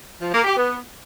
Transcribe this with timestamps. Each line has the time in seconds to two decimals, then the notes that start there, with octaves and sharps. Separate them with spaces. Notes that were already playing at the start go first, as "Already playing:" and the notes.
0.21 F3
0.33 A#3
0.44 G4
0.56 B3